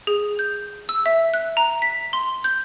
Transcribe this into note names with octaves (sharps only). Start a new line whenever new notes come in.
G#4
G6
E6
E5
F#6
A#5
B6
C6
G6